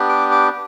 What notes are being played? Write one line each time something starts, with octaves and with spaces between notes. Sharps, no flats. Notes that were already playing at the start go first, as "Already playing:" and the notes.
Already playing: B3 D4 G4
D6
D6